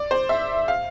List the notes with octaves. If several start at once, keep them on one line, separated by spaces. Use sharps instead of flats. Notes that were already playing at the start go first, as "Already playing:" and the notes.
Already playing: D5
C5
E5
F5